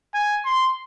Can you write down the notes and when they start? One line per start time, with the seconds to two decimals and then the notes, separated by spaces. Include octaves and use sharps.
0.14 G#5
0.45 C6